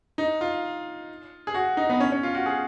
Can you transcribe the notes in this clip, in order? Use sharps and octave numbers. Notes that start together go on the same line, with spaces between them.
D#4
F4
G#4
F#4
D#4
B3
C#4
C#4
F4
F#4
G#4